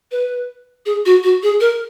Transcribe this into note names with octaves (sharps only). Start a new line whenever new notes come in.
B4
G#4
F#4
F#4
G#4
A#4